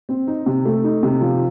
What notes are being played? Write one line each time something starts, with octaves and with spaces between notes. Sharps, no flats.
C4
D#4
C3
A3
D#4
C3
F3